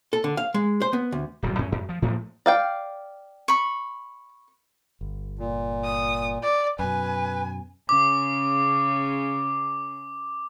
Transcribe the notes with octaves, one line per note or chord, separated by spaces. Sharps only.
A4
D3
F5
G#3
C5
B3
D2
D1 F#2 B2 G3
F#2 C#4
F#2
F3
A2 F3 A3 A#3
D5 F5 G5
B5 C#6
G1
A#2
D#6
D5
F#2 B2 B4 G#5
C#3 D6